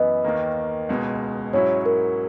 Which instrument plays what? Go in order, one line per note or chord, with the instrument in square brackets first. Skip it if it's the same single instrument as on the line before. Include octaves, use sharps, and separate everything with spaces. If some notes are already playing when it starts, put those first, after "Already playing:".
Already playing: [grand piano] F#2 E3 B3 [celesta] B4 D#5
[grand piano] D#2 D#3 A#3
C#2 B2 G#3
[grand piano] G#2 F#3 C#4 E4 [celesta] C#5
[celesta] A#4